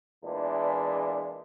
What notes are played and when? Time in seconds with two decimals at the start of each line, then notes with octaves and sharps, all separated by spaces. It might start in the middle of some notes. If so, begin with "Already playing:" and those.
0.24 E2 A#2 E3 G#3 D4